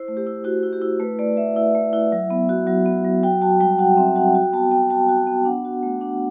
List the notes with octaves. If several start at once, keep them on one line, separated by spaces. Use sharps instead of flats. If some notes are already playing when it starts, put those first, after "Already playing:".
Already playing: E4 C5
A3
G4
E4
E4 F#4
E4
G4
E4
A3 B4
A3 D5
A3 E5
E4 E5
A3
E4
F#3
B3
F#4
F#3
B3
F#3
F#4 G5
F#4 A5
G3 G5
F#4 F#5
C4 E5
F#4 F#5
F#4 G5
B3 A5
B3 G5
F#4 A5
F#4
G5
B3
D4 F#5
F#4
A3
D4 F#5